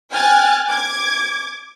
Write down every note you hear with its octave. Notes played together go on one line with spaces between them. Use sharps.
G5 G#5 F6 F#6 G#6 A6
D6 G#6